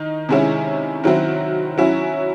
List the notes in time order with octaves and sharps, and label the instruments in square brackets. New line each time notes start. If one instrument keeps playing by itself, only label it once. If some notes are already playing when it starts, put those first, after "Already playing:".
Already playing: [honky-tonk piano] D#3 D#4
C3 D#3 G#3 C#4 E4
D#3 F#3 C4 E4
F#3 C#4 E4